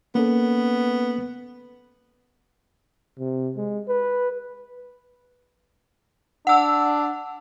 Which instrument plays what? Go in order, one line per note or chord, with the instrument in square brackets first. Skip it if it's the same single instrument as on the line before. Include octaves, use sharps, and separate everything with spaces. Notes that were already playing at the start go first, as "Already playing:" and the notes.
[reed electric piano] A#3 C#4 A4 [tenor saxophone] B3
[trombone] C3
G#3
B4
[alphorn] D4 [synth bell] F#5 E6